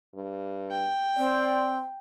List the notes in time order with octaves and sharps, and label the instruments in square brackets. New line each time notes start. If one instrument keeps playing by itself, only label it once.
[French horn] G2
[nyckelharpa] G5
[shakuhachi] C4 [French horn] D5